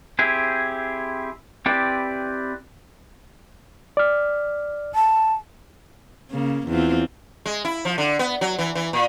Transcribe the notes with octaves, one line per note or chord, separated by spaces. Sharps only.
C4 E4 G4 G#4
C4 E4 G4 B4 D5
D5 F6
A5
C#3 A#3
E2 C4 F4
G#3
E4
F3
D3
B3
F#3
E3
E3
A#2